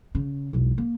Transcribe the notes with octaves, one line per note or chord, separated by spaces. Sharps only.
C#3
E1 B1
A#3